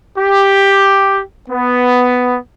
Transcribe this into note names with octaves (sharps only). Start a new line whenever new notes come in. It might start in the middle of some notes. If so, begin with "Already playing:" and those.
G4
B3